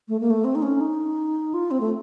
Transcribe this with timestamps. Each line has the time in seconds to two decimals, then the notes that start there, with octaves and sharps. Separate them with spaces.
0.09 A3
0.20 A#3
0.30 A3
0.45 C4
0.55 D#4
0.62 C#4
0.81 D#4
1.54 F4
1.71 C4
1.81 A3